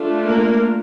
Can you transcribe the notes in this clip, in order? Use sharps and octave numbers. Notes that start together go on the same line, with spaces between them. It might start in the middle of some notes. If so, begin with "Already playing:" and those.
Already playing: A3 D4 F4
A#3 A#4